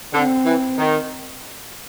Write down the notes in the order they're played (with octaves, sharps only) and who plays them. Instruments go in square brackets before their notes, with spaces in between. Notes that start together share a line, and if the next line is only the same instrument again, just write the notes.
[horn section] D3 [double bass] C4
[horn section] E3
D#3